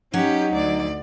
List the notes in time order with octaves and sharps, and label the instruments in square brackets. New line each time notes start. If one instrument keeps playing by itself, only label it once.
[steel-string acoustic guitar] F#3 [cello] C#4 G4 [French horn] D#4
[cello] D2 D5